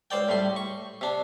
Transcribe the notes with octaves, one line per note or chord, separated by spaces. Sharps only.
C#2 C5 D5 G5
A2 G3 C6
C#6
C3 D4